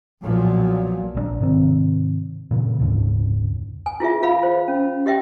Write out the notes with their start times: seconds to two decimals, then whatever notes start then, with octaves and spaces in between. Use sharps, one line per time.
0.23 B1 A#2 F3 F#3
1.15 A#1 E3 D4
1.40 G#2 C3 D#3 C4
2.51 A#2 C#3 E3
2.79 F1 D2 G#2 C#3
3.86 G#5
4.00 E4 F4 G#4 E5
4.22 F4 F5 B5
4.43 C5
4.68 C#4
5.06 G4 D#5 E5 G5